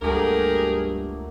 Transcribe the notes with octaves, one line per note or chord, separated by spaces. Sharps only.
C#2 G2 F#3 A3 A#3 G4 G#4 A#4